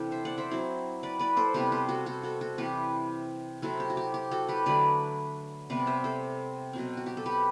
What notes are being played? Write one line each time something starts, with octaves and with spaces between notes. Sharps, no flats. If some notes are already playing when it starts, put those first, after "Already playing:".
Already playing: C3 E3 B3 D4 G4 A4
C5 E5
D5 F#5
C5 E5
F#3 C4 E4
B4 D5
B4 D5
A4 C5
C3 G3 B3 G4 B4
A4 C5
F#4 A4
F#4 A4
F#4 A4
F#4 A4
C3 E3 G3 G4 B4
C3 F#3 C4 E4 F#4 A4
G4
F#4
G4
G4
F#4 A4
G4 B4
D3 F#3 A3 B4 D5
C3 G3 B3 B4 D5
C5 E5
A4 C5
B2 F#3 C4
F#4
G4
A4
G4 B4